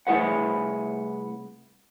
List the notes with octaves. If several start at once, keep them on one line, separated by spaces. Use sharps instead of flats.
C2 A3 E4 G#4 B4 F#5